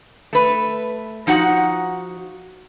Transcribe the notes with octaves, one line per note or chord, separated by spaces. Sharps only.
A3 B4
F3 D#4 F#4 F#5